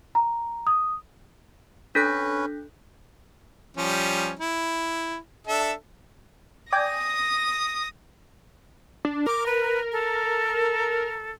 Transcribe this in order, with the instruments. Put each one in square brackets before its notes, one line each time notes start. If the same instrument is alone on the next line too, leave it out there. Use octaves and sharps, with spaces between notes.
[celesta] A#5
D#6
[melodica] C#4 B4 [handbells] D4 A4 F#6 [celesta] G6 A#6 B6
[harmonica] F3 G3 C#4
E4
D4 A4 E5
[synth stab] D5 G5 G#5 [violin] D#6 A#6
[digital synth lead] D4
[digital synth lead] A#4 [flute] D6
[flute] B4
A4